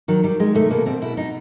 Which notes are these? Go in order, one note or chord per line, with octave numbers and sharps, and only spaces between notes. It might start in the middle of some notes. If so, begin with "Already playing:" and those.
D#3 F#3
D#3 G3
D#3 G#3
C3 A3
B2 A#3
B2 C4
B2 E4
B2 D#4